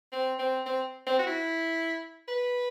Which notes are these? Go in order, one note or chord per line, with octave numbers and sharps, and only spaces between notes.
C4
C4
C4
C4
F#4
E4
B4